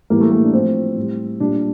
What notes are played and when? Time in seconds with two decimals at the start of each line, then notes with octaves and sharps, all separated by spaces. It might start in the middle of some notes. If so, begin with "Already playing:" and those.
0.10 A2 E3 G3 A#3
0.21 A3
0.32 A#3
0.44 D4
0.53 A2 F3 C4
0.96 A2 G3
1.40 A#2 G3 D4